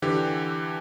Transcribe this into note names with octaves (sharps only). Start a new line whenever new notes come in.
D3 E3 G4